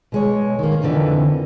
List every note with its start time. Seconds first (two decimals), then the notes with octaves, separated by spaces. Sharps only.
0.12 B2 G#3 C#5
0.59 D#3 A#3
0.82 F2 D3 E3 C4 D#4